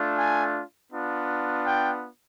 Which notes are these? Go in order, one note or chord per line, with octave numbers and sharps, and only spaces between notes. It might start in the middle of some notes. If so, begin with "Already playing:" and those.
Already playing: A3 D4 F4
G#5
B3 D4 F4
G5